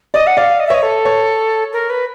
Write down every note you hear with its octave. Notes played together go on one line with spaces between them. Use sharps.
D5 D#5
F#5
D5 F5
D#5
E5
C#5 D#5
A4
C#5
A#4
B4